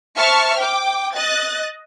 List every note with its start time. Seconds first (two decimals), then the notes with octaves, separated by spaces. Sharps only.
0.17 C5 E5 A5 C#6 F6
0.59 G5 D6
1.15 D#5 F#6 A6